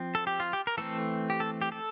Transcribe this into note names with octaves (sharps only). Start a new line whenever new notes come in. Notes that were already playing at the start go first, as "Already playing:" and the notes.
Already playing: F3 C4
A4
G4
F4
G4
A#4
E3 A3 C4 A4
G4
A4
G4
A4